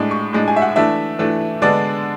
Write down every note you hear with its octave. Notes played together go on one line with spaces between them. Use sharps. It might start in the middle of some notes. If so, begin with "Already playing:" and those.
Already playing: A2 G#3 D4
C#6
A2 G#3 D4
G#5
E5
F#5
E3 A3 D4 E5
E3 A3 D4
D3 G#3 B3 D4 D5